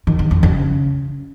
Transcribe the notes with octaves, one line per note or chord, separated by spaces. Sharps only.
D#3
E2
F2
C#3